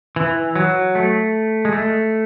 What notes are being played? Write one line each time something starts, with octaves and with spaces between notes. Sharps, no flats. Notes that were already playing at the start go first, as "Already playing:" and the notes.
E3
F#3
A3
G#3
A3